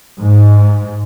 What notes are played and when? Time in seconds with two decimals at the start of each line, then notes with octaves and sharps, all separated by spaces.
0.21 G#2